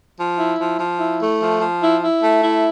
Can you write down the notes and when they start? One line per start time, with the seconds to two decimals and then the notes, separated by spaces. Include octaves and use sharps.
0.18 F3
0.37 E4
0.58 F3
0.79 F3
0.99 E4
1.20 A3
1.41 F3
1.61 F3
1.82 E4
2.02 E4
2.23 A3
2.43 E4